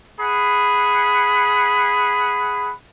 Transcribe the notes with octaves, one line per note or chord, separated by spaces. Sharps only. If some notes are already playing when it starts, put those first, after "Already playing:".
G#4 F#5 B5